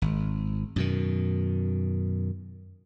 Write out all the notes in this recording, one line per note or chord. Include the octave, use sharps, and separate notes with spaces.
G#1
F#2 B2 D#3